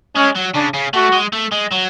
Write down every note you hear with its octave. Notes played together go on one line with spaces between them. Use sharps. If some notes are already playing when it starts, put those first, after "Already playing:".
G#3 C#4
F#3
C#3 D4
C#3
A3 F#4
G#3
A3
G#3
F#3